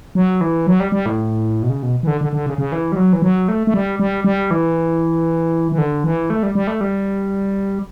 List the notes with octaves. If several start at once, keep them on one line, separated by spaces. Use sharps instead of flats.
F#3
E3
F#3
G3
G3
A2
B2
C#3
B2
E3
D3
D3
D3
C#3
C#3
E3
G3
F#3
E3
F#3
A3
A3
G3
G3
G3
E3
E3
D3
E3
A3
G3
G3
A3
G3